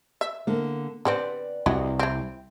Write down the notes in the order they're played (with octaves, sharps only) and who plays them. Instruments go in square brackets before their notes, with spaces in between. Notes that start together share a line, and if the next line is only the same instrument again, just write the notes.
[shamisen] E5
[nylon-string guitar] D3 A#3
[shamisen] D3 G3 C4 [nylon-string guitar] B4 D5 F#5
[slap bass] C2 [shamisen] E4 F#4 D#5
[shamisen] C4 E4